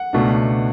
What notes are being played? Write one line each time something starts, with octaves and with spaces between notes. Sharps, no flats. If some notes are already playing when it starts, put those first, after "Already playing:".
Already playing: F#5
C#2 B2 A3 D4